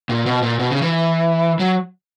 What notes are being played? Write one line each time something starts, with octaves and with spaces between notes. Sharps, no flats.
A#2
B2
A#2
B2
C#3
E3
F#3